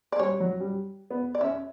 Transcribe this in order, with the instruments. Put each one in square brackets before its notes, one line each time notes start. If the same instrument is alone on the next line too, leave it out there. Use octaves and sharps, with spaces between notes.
[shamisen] D5
[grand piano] G3 [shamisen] C#5
[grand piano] F#3
G3
B3
[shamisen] D5
[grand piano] C#4 [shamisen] E5